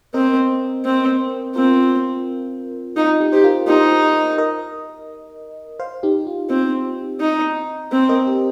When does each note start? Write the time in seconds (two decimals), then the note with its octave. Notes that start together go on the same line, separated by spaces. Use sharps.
0.14 C4 A#4 D#5
0.85 C4
1.55 C4 F4 A#4
2.97 D#4 F4
3.20 D#4 G4
3.33 G4 C5
3.44 F4 A#4
3.68 D#4 G4 C5
4.38 A#4 D#5
5.80 C5 F5
6.03 D#4 G4
6.27 F4
6.50 C4 D#4
7.20 D#4
7.92 C4
8.09 A#4 D#5
8.27 G4 C5